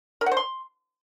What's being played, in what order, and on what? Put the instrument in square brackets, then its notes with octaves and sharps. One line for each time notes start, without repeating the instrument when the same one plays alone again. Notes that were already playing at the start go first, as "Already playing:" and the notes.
[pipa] A#4
F#5
C5
C6